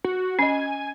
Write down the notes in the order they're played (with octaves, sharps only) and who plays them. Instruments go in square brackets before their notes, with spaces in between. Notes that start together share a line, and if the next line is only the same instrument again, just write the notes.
[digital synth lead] F#4
[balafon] C#4 D#5 [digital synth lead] G#5